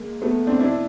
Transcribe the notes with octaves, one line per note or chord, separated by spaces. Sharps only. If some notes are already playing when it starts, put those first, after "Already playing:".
Already playing: G#3 A#3
A3 B3
C4 D4
D4 E4